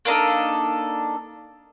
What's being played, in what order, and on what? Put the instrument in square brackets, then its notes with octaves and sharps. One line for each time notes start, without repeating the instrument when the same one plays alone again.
[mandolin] A#3 D4 D#4 A4